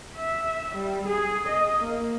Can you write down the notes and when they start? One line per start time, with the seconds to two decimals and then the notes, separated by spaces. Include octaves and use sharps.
0.16 E5
0.75 G3
1.07 G#4
1.47 D#5
1.82 A#3